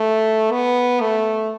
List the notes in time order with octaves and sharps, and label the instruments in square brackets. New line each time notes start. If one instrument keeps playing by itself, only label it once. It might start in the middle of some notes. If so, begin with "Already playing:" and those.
Already playing: [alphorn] A3
B3
A3